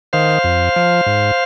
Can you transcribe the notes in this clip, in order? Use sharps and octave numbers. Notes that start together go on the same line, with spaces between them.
D#3 C5 F5
F2
F3
G#2